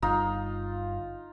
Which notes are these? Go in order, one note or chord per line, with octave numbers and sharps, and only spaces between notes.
G1 D#4 F4